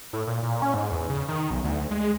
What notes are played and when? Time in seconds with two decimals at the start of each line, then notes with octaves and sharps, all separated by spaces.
0.13 A2
0.27 A#2
0.42 A#2
0.62 C#4
0.74 G#2
0.91 E2
1.10 C#3
1.28 D#3
1.51 B1
1.64 D2
1.91 G#3